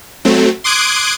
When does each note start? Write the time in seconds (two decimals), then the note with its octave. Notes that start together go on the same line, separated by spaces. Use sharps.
0.25 F#3 A3 C4
0.64 C6 D6 D#6 F#6 G#6 D7